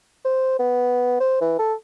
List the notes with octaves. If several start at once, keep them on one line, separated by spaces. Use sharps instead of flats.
C5
B3
C5
E3
A4